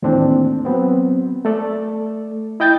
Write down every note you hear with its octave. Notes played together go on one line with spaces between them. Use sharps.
D#2 A2 E3 C4 D4
F#3 B3 C4
A3 A4 D5
E4 D#5 G5 G6 A6